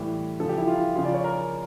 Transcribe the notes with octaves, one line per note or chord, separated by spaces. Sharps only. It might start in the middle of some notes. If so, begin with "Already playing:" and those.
Already playing: A2 E3 G3 G4
C#3 F3 A4
G4
E4
F4
C#3 F3 F4
D5
C#5
A#4